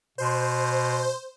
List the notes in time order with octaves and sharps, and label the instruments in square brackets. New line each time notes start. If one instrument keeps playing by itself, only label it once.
[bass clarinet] B2 [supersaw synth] C5